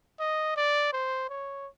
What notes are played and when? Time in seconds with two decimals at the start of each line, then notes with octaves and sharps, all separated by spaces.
0.20 D#5
0.57 D5
0.93 C5
1.30 C#5